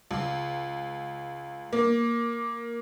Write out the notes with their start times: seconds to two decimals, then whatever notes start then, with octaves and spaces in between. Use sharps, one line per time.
0.11 C#2
1.73 A#3